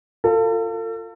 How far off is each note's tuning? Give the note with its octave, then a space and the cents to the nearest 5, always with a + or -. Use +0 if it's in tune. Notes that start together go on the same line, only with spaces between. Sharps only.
F4 +0 A4 +35